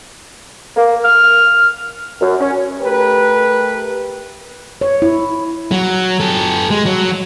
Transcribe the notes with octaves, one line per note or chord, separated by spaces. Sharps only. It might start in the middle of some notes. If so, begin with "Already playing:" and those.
A#3
F6
F#2
C#4
A3 G4 A#4 B4
C#5
E4
F#3
G4 A4
G#3
F#3